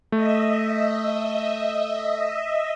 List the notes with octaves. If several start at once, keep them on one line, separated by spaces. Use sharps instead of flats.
A3 D#5 E5